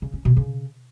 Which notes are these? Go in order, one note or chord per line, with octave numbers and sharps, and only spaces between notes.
C#3
C#4
B2
C#3